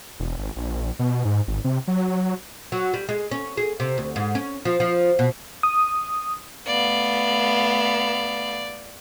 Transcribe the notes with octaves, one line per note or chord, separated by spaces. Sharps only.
E1
G#1
A#1
B2
G#2
G#1
C3
F#3
F#3
G3
G#3
C#4
G#4
C3
D2
G#2
C#4
F3
F3
B2
D#6
A3 B3 D5 F5